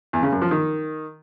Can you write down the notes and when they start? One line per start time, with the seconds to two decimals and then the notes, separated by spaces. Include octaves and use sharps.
0.13 E2
0.23 C#3
0.32 F#2
0.42 F3
0.51 D#3